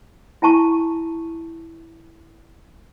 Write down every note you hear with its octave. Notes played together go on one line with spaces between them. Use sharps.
E4 G#5 A5 C#6